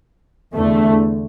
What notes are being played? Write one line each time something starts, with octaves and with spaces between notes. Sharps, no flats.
E2 D3 A3